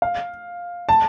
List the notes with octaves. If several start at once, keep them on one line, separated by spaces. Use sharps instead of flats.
F5
A5